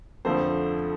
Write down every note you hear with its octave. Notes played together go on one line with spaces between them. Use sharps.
F2 D3 F3 A3 C5